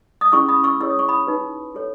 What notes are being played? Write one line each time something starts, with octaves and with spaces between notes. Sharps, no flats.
D#6
C#4 E4 G#4 C#6 E6
B5 D#6
C#6 E6
E4 G#4 C#5 E6
D#6
C#6
B5 D#6
D#4 F#4 B4
F#4 A4 C#5